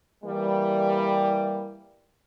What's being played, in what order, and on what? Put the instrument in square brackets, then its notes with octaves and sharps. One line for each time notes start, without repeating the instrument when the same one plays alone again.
[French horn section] E3 G3 A#3